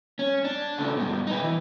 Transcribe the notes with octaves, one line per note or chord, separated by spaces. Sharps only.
C#4
D4
C#3 A3
G2 B2
D#4 B4
E3